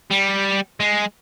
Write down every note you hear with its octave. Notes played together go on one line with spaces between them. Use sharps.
G3
G#3